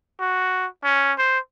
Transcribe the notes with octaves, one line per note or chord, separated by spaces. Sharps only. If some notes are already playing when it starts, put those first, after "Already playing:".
F#4
C#4
C5